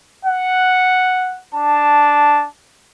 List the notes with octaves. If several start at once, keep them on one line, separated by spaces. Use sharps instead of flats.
F#5
D4 A5